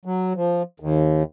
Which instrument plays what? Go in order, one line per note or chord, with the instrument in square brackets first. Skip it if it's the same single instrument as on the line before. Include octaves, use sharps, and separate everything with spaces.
[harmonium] F#3
F3
D#2